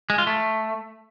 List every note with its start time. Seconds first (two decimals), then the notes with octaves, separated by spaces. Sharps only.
0.10 G#3
0.18 F4
0.27 A3